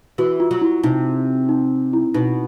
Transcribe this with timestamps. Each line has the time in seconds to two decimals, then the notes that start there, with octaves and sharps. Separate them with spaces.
0.18 E3 F#4
0.40 F4
0.51 F#3
0.61 E4
0.83 C3 D#4
1.49 D#4
1.93 E4
2.14 B2 D#4